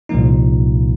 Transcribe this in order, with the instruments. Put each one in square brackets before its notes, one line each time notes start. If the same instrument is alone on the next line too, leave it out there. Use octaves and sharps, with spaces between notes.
[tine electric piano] C2 A#2 F3 A#3 D#4